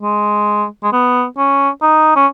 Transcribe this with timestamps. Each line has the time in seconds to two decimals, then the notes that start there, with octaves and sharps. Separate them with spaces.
0.02 G#3
0.84 G#3
0.93 B3
1.38 C#4
1.82 D#4
2.16 C#4